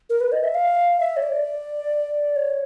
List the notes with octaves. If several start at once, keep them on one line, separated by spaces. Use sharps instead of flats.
A#4
B4
D#5
E5
F5
E5
C#5
D5
C#5